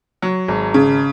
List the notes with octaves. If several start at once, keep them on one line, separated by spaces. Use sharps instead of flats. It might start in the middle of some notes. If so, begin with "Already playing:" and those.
F#3
G#1
C#3